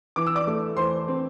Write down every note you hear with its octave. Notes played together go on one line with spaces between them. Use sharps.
E3 D6
E6
D5 D6
A3
E3 C5 C6
C4